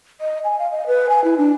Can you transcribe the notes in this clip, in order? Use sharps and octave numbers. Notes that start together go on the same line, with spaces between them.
D#5
G#5
F5
D#5
B4
G#5
E4
D4